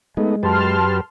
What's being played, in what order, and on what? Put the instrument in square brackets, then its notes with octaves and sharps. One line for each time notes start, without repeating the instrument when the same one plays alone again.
[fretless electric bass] G#3 [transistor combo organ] A3 B3 D#4
[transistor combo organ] F#2 G4 B4 [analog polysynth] A5 C6 F6